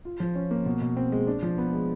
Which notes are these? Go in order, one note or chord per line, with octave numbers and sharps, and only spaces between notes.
F4
F3
C#4
A#3
B2
B2
C4
G#3
D4
F3
B3
G#3